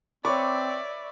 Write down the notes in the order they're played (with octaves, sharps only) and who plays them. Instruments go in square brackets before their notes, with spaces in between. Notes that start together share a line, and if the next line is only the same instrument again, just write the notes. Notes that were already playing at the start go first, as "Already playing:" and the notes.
[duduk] C4 [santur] B4 C#5 [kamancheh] D5 E5 [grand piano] C#6 D6